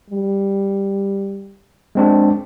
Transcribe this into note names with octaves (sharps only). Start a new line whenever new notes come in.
G3
G#3 C4 D4